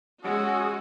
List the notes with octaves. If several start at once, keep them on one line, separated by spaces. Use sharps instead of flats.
G#3 C#4 F#4 F#5 D#6 E6